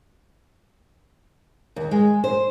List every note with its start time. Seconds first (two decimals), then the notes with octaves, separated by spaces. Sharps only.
1.76 D#2
1.91 G#3
2.24 C5